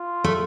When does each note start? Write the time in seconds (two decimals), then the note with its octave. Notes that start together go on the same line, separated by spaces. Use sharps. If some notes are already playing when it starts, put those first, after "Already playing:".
Already playing: F4
0.24 A3